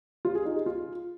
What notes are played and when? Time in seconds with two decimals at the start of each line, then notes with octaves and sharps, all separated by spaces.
0.25 F4
0.35 G#4
0.45 D#4
0.56 G#4
0.66 F4